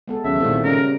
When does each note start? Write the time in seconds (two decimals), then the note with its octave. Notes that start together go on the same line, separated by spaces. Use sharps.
0.08 G#3 B3 A4
0.24 D#2 C#3 F#3 E5
0.40 C2 A#2 D#3 A3 C4
0.64 C#3 G3 A#4